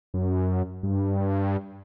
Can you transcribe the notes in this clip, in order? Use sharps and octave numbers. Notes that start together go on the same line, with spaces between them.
F#2
G2